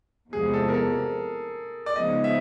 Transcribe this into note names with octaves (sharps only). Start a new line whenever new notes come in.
E2 C3 F3 G#3 B3 G#4
A4
A#4
A4
D5
C#3 F3 G#3 B3 D#4 D#5
E5